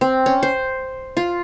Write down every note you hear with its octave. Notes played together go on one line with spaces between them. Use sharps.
C4
C#4
C5
F4